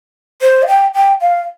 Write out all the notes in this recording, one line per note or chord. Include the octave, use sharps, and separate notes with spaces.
C5
F5
G5
G5
F5